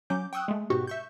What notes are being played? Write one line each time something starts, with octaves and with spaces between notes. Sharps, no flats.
F#3 C#4 D6 G6
G5 C#6 D#6 E6 F#6
G#3 A3
G#2 B2 F#4 G4 C#6
E5 C#6 G6